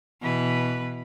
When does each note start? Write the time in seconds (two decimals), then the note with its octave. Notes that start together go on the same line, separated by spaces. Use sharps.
0.21 B2 E3 B4